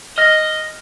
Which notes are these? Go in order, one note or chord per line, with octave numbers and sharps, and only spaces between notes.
D#5 F6 A#6